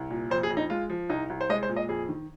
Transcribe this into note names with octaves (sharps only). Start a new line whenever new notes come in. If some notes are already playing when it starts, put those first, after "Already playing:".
Already playing: C2
A#2
F2 C5
G#4
F2
D#4
G#3 F4
F3
C2 D#4
C2
C5
G#3 D#5
C5
A#2
D#5
F2 G#4
D#3